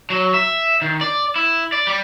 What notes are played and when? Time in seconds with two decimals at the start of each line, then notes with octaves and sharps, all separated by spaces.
0.10 F#3
0.34 E5
0.81 D#3
1.01 D5
1.36 E4
1.72 D5
1.87 G3